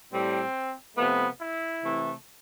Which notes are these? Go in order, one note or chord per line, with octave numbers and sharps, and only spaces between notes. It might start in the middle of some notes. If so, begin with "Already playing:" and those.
A2 G3 C4
C3 F3 A3 B3
E4
C3 E3 A3